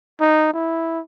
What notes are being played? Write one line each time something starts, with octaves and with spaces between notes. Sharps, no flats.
D#4
E4